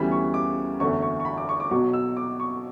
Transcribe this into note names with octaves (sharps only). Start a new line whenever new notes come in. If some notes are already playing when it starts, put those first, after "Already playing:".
Already playing: D2 C#3 E3 G3 B3 B5
C#6
D6
F#1 E2 D3 A3 C#6
C#6
C#6
B5
D6
C#6
D6
B1 B2 F#3 C#6
E6
D6
C#6